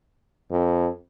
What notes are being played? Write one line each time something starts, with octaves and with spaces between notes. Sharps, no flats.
F2